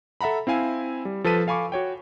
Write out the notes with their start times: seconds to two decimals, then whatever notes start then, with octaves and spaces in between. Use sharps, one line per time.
0.21 A4 E5 F#5 A#5 B5
0.47 C4 E4 F5 G#5
1.05 G3
1.24 F3 A4 B4 A5 B6 D#7
1.47 A4 F5 G#5 B5 C#6 D6
1.72 F#4 C#5 G5